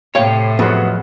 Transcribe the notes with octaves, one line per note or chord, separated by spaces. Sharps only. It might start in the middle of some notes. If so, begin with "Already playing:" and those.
A2 C3 C#5 F5 G5
F2 F#3 B3 F#4 G#4